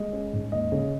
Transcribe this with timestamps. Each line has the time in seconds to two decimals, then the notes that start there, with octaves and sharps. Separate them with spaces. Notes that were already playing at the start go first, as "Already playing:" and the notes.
Already playing: G#3 D#5
0.13 C#4
0.33 G#2
0.52 D#2 D#5
0.72 C#3